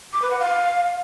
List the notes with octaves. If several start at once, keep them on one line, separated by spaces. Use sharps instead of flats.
D6
B4
F#5
F5